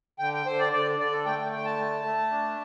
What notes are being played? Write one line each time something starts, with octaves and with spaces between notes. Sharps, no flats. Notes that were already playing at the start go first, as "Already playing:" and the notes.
D3 G5
G5
D3 C5
D5
D3 D5
D3 D5
A4
A3 G5
G5
D3 G5
A5
A3
A3
D4